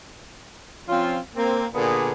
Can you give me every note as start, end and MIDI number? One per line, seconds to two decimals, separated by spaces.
0.89 1.18 53
0.89 1.18 60
0.89 1.18 61
0.89 1.18 65
1.36 1.65 58
1.36 1.65 60
1.75 2.13 46
1.75 2.13 50
1.75 2.13 58
1.75 2.13 59
1.75 2.13 62
1.75 2.13 68